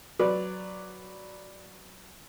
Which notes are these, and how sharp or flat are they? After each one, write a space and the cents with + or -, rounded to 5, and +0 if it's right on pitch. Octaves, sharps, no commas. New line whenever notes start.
F#3 +5 B4 +0 D5 +0